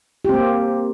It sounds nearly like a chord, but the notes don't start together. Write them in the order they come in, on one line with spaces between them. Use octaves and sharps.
G4 C4 A#3